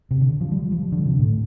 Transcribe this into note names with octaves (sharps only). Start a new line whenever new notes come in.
C3
D3
F3
G3
F3
D3
C3
A2